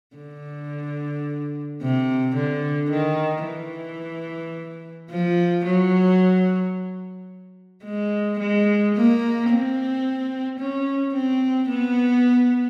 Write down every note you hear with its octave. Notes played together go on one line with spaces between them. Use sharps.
D3
C3
D3
D#3
E3
F3
F#3
G#3
G#3
A#3
C4
C#4
C4
B3